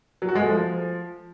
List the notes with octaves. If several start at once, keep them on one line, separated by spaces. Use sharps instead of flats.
F#3
F#4
G#3
A3
F3